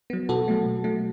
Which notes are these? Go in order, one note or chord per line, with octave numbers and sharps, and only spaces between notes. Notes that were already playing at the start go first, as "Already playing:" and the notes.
F#3 B3
B2 F#4 A4
F#3 A3
B2
F#3 A3